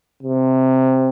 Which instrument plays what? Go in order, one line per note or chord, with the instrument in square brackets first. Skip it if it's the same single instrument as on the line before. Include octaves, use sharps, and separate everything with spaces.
[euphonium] C3